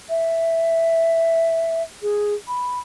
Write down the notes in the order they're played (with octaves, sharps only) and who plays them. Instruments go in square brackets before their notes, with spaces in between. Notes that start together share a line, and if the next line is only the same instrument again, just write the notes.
[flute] E5
G#4
B5